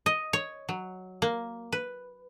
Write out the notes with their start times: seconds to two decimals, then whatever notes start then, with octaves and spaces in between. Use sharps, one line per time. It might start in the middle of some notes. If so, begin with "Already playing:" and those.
0.06 D#5
0.33 C#5
0.69 F#3
1.22 A#3
1.72 B4